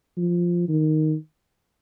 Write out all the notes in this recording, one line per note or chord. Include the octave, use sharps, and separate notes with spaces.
F3
D#3